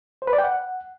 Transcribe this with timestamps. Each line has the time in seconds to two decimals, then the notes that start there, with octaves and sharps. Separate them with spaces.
0.22 C5
0.27 B4
0.33 D5
0.38 G5
0.44 F#5